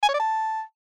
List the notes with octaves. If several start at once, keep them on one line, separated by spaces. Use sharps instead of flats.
G#5
C#5
D5
A5